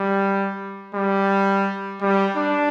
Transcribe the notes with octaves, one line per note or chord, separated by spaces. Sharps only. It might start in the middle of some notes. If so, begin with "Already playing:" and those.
Already playing: G3
G3
G3
D4